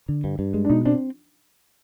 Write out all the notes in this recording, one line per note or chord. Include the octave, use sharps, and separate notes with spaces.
D3
G2
G2
G#3
D4
B2 D#4
C4 D4